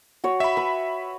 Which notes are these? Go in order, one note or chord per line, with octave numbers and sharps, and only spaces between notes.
F#4 C#5
E5 B5
B4